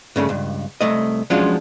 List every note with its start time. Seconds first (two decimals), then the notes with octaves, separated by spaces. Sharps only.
0.16 G2 C#3 A3
0.29 C#2 G2
0.81 C2 A3 D#5
1.30 F3 F#3 G#3 C#4 D4 F4